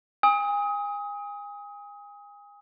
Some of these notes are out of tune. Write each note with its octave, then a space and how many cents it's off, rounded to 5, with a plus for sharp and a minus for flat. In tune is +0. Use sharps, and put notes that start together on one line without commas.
G#5 -30 D#6 +25